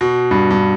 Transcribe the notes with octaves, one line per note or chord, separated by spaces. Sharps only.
B2
G2
G2